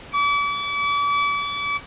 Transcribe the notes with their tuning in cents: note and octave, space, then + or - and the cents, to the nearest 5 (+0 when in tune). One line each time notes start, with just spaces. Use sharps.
D6 -40